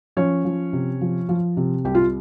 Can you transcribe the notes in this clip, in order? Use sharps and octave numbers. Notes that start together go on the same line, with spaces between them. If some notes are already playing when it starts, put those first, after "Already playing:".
F3 C#4 C#5
F3
C3
F3
F3
C3
C2 G4
F4